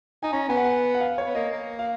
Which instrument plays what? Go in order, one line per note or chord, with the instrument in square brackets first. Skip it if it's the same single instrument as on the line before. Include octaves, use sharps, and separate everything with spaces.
[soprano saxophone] D#4 [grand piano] G#5
[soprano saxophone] C#4 [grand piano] A#5
[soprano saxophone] B3 [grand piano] G#5
[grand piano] F#5
G#5
F#5
F5
C#5
[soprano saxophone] B3
[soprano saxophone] A#3 [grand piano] D#5
[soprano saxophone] A#3
[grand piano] F5